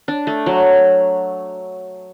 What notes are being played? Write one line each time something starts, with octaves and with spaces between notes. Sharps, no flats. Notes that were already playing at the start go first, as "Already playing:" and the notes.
D4
A3
F#3